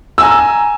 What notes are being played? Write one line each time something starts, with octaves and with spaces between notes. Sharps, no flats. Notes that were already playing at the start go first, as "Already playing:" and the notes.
G#5 A#5 E6